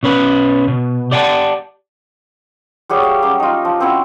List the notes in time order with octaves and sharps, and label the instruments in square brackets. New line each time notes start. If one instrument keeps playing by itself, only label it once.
[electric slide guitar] B2 C#4 B4
B2
G4 D5 F#5 G5 A5
[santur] G3 F#4 G#4 C#5
F5
F#3 G3 C#4 G4
D#4 F4
F3
C4 C#4 E4 F#4